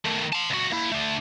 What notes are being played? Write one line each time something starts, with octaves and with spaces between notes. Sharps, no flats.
D#3 A3
A5 C6
C#2 F#4
A#3 E4
A3 D4